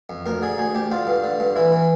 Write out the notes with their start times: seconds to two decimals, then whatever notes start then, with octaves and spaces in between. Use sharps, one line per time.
0.10 F2
0.26 D2 A#4
0.42 D3 G#4
0.58 D2 G#4
0.75 D2 G4
0.92 D3 F4
1.07 G2
1.24 D3
1.40 G2
1.56 E3 E4
1.72 E3